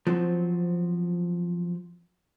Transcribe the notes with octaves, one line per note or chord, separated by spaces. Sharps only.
F3 F#3 C4